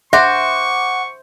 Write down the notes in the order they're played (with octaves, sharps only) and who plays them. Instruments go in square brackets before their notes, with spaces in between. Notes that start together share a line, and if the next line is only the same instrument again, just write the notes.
[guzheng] C5 [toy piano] E5 [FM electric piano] F#5 D6 [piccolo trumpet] C#6